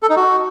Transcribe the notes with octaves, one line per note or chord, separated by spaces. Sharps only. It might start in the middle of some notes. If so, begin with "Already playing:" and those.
A4
D#4
F#4